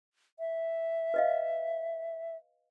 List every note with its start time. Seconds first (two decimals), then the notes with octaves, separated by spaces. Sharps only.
0.39 E5
1.14 B4 D#5 F5